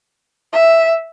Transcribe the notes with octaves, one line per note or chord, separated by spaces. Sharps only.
E5